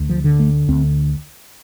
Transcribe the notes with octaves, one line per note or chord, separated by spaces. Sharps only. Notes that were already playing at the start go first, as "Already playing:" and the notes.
Already playing: D2
F3
D3
A3
D2 C4